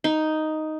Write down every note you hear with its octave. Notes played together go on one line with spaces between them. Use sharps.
D#4